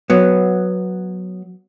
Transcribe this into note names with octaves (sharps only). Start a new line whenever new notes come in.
F#3 B3